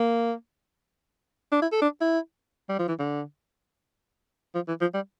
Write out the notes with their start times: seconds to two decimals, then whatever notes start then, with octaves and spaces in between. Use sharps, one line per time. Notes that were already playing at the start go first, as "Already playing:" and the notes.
Already playing: A#3
1.52 D4
1.62 E4
1.72 A4
1.82 D4
2.01 E4
2.69 G3
2.79 F3
2.88 E3
2.99 D3
4.55 F3
4.68 E3
4.81 F3
4.94 G3